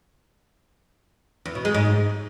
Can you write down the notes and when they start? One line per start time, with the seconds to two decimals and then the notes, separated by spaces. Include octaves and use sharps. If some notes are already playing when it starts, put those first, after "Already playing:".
1.45 E2
1.55 B2
1.65 G#3
1.75 G#2